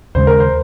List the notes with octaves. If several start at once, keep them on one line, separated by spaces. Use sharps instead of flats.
D#2 C#3 G#3 C5
A#4
C5